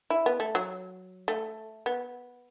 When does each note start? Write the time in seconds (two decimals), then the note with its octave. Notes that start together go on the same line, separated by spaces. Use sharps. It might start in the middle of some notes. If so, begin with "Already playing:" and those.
0.10 E4
0.26 B3
0.40 A3
0.55 F#3
1.28 A3
1.86 B3